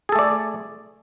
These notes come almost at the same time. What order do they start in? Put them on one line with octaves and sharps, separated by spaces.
G#4 A4 A3 D5